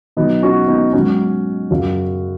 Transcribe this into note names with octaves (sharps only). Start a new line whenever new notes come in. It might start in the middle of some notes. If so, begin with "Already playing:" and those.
B2 F#3 B3 D#4
C#4 F#4
B3 D#4
G#2 F#3 C#4 F#4
F#2 C#3 F#3